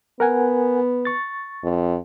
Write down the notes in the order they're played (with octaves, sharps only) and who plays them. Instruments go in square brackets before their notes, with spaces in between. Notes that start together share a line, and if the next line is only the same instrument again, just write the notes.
[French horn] B3 [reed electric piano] A#4 F#5 G#5
[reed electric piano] C#6 A6
[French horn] F2